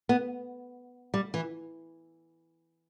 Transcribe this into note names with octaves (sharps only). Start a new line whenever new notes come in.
B3
G3
E3